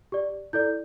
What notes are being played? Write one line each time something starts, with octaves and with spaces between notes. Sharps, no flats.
G4 D5
E4 A4 D5 G6